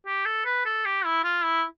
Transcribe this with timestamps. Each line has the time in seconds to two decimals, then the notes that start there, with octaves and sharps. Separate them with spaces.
0.06 G4
0.25 A4
0.45 B4
0.65 A4
0.85 G4
1.05 E4
1.24 F4
1.44 E4